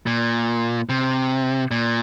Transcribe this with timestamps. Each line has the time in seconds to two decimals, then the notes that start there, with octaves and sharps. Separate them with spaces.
0.07 A#2
0.89 C3
1.71 A#2